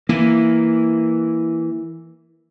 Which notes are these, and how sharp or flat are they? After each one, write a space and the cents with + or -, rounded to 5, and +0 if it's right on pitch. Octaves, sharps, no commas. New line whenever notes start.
E3 +0 A#3 +0